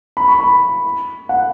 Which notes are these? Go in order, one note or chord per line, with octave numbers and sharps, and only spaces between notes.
B5
C#6
B5
F#5